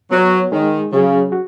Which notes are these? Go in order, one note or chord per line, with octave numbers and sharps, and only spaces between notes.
F#3 B3 F#4 C#5
D#3 G#3 D#4 G#4
C#3 F#3 C#4 G#4
F#4